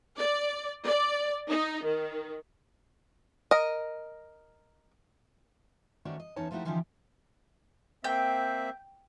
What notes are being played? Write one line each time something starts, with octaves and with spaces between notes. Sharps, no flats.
D5
D5
D#4
D#3
A#4 D#5
D#3 A3 C#4 F#4 C5 D5
D#5
E2 C#4 D#4 C#5 A5
F3 A3 D#4 E4 F#4 G4
D3 E3 F3 C#4 D#4 G4
A#3 C4 E5 G5